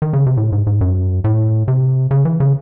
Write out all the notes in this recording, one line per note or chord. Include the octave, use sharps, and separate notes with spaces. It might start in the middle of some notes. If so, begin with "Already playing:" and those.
D#3
C#3
C3
A2
G#2
G#2
F#2
A2
C3
C#3
E3
C#3